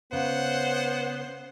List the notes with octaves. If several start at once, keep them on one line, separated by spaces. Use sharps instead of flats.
C#3 B3 C5 F#5